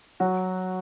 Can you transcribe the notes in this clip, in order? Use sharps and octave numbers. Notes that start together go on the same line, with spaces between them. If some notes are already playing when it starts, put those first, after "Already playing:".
F#3 F#4